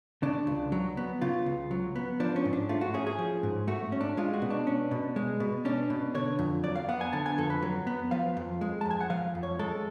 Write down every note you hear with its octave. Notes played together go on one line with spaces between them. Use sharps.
C#3 D4
C#2
F#3
B3
C#3 F4
C#2
F#3
B3
F3 D4
C#4
G#2
D4
A3 F4
F#4
C#4 G#4
G#4
F3
G#2
A3 F#4
C#4
D4
G#3 F4
F#4
B2
D4
C#4
B2
G#3
B2
C#4 D4
B2
D3 C#5
F2
F#3 D5
F5
B3 F#5
G#5
D3 A5
G#5
F2 A4
B4
F#3
B3
F3 F5
F2
G#3
A5
F2
G#5
F#5
F3 F5
F2
C#5
G#3 A4